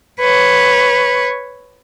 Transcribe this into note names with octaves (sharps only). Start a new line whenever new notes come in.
B4 C#5